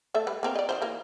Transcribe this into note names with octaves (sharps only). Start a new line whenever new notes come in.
A3 A4 E5
G3 B4
A#3 C4 A#4
D5 D#5
D#3 G#3 C5
E3 A#3